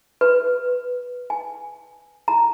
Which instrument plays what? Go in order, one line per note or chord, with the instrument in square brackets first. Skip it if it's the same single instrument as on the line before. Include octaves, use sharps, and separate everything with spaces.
[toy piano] B4
G#5
A#5